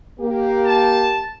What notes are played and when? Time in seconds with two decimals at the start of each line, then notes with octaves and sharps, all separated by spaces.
0.20 A#3 G4
0.66 A5